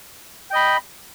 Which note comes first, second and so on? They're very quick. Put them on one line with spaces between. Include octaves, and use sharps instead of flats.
G5 D#5 B5